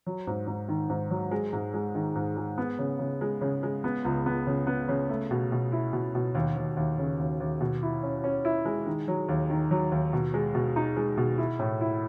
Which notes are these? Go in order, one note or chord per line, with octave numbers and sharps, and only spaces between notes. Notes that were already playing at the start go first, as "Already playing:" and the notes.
F#3
G#2
G#2
D#3
G#2
F#3
G#3
G#2
G#3
D#3
G#2
G#3
B3
C#3
C#3
G#3
C#3
G#3
B3
C#2
B3
C#3
B3
C#3
A3
B2
B2
E4
B2
B2
D#2
D#2
D#2
C#3
D#2
D#2
B2
E4
C#4
C#4
E4
G#3
D#3
F#3
D#2
D#3
F#3
D#2
B2
G#3
B2
D#4
G#3
B2
E4
A2
E4